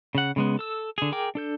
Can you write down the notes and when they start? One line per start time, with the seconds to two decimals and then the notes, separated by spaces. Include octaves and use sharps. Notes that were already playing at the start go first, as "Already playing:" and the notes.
0.15 C#3 F#5
0.36 C#3 G#3 B3
0.59 A4 E6
0.98 D3 G#4
1.12 G#4 A#4 G5 D6
1.35 D4 A4 G6